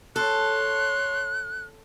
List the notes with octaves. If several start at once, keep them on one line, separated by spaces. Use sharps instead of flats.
A4 C#5 C6 F#6